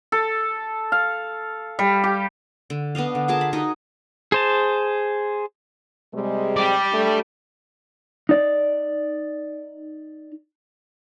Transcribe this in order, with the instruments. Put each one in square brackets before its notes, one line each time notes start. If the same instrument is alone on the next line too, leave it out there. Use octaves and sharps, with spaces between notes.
[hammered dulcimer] A4
F5
G3
G4
[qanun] D3
B3 D4 D#5 F5
D3
F4 G#4 A#4 A5
B5
D#4 F#4 A#4 D#5
[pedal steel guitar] G#4 C5 A5
[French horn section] C3 G3 G#3
[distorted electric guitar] G4 D5
[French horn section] A3 D4
[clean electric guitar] D#4 D5